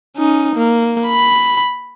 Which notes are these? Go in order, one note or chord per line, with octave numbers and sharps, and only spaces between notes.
C#4 D#4
A#3
B5